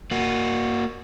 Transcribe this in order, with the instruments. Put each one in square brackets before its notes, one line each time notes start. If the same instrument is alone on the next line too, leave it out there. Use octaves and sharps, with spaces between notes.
[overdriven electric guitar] A#3 F#4